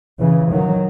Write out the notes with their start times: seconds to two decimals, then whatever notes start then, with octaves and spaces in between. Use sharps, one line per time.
0.20 C#3 E3
0.51 D#3 F#3